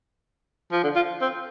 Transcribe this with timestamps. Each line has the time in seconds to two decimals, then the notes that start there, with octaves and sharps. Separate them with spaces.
0.72 F3
0.84 D3
0.96 F4
1.21 C4